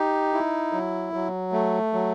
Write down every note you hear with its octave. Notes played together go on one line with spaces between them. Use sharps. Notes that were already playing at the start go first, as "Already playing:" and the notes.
Already playing: D#4 G4
E4
F#3
F#3
A3
F#3